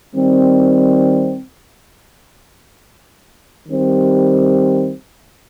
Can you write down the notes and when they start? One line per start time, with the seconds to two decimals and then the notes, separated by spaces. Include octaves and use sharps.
0.13 D#3 G3 C4
3.68 D#3 G3 C4